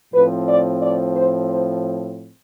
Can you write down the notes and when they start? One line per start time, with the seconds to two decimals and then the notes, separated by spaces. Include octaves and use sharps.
0.14 A2 F3 C4 B4
0.48 D5
0.82 D5
1.16 C5
1.50 C5